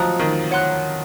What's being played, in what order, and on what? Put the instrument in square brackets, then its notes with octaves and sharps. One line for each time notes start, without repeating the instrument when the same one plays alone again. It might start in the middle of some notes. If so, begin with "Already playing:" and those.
Already playing: [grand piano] F3 F#3 [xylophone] D#5 A#5 D#6 F#6
[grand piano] D#3
[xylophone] C#5 F#5 C6 F#6